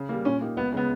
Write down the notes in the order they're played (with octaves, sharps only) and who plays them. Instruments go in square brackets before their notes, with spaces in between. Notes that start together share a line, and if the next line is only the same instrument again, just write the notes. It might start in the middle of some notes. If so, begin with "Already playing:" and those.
Already playing: [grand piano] C#3
G3 A#3
[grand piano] A#2 [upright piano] C#4
[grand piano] A#3 D#4 G4
[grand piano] C#2 [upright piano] B3
[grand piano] C#3 G#3 [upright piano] B3